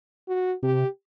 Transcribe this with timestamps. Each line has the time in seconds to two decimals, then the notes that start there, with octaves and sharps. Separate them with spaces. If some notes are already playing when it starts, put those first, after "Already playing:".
0.28 F#4
0.63 C3 G4